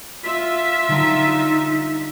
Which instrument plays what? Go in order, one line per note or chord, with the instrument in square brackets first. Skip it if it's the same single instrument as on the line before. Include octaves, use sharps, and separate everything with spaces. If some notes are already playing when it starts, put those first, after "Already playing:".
[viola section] F4 E5 [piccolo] B6
[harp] D3 G3 A#4 [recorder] D#4